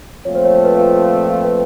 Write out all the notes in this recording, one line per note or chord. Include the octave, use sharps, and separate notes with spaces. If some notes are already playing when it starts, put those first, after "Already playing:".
A#2 F3 A3 C4 F4 C#5
C5
C#5
C5
B4
B4